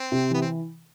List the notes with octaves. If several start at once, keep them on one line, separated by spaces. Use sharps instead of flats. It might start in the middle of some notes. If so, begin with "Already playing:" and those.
Already playing: C4
C3
E3 B3
C4